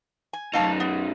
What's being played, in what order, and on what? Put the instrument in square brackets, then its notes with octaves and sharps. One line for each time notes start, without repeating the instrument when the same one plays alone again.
[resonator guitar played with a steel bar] G#5
[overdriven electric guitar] F#2 D#4 [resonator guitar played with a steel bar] A3 F5 A5
[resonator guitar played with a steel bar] B3